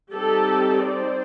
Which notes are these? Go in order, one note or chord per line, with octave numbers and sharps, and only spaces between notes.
G3 C4 D#4 G4 A4
C5 D5